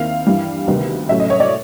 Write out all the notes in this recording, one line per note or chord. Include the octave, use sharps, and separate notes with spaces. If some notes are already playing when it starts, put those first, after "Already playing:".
Already playing: D#2 D#3 C4 E4 F5
G2 E3 G3
D2 C3 D#3 G3 B3
A2 F#3 A3 C#4 E5
D#5
C#5
D5